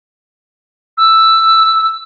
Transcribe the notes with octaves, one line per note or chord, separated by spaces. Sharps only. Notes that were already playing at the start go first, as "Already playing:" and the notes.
E6